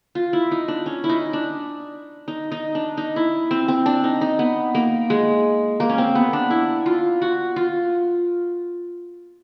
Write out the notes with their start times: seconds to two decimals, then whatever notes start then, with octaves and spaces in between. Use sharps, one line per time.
0.15 F4
0.33 E4
0.51 D#4
0.68 D4
0.86 C#4
1.04 E4
1.09 D#4
1.33 D4
2.28 D#4
2.52 D#4
2.75 D4
2.97 D#4
3.16 E4
3.51 C4
3.68 C4
3.86 D4
4.04 D#4
4.21 D#4
4.39 B3
4.75 A#3
5.10 G#3
5.80 A#3
5.89 C#4
5.98 C4
6.15 B3
6.33 D4
6.50 E4
6.86 F4
7.22 F#4
7.56 F4